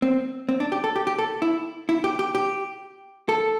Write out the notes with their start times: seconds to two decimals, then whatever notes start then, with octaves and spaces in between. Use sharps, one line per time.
0.02 C4
0.49 C4
0.60 D4
0.72 G4
0.84 A4
0.96 G4
1.07 G4
1.19 A4
1.42 E4
1.89 E4
2.04 G4
2.19 G4
2.35 G4
3.29 A4